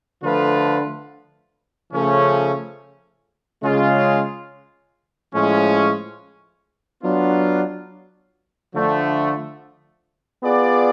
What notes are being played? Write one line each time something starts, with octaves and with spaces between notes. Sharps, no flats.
D3 F3 A3 F4 B4
C#3 F3 A3 C#4
C#3 G#3 C#4 F4
A2 F3 G#3 C#4
F#3 B3 D4 F4
D3 F3 A3 D4
B3 F4 G#4 D5